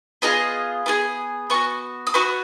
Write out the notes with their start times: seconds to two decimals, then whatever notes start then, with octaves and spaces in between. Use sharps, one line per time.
0.22 B3 F4 G#4 D#5
0.86 B3 F4 G#4
1.50 B3 F#4 C#6
2.07 D#6
2.14 B3 F#4 C#6